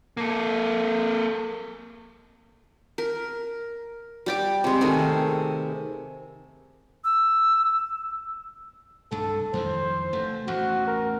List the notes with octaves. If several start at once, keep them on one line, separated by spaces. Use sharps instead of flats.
A#3 A4
A#4
G3 G4 D6
C3 G#3
D#3 A3 G#4 G#5
E6
C2 G2 A4
F2 D#3 E3 C5
F1 A3
A1 E2 F#4
A#4